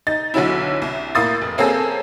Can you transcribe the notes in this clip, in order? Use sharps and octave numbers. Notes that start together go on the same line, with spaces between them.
D#4 A6
B1 D3 F#3 C#4 E4
C2
A2 A#3 D#6 A6
F1
A#3 C4 C#4 G#4 A4